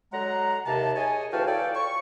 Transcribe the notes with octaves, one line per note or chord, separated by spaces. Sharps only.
D3 F#3 G#3 F#5 A#5
D#2 C3 A5
D#4 G#4 C#5 D#5 G#5
D2 E3 F#4 F5 G5 A5
F4 A4 C#5 D5 G5
C#6